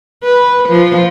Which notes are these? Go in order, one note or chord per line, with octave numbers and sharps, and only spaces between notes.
B4
F3